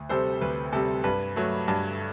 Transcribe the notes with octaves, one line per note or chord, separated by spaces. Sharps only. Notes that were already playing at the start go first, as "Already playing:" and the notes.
Already playing: D2
C3 G3 A4 C5
D2 B4
C3 G3 A4
G2 B4
F#3 A3
G2